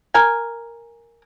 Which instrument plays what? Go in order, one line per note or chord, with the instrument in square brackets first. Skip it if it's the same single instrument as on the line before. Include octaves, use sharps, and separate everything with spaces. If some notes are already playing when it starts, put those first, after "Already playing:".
[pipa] A#4 G#5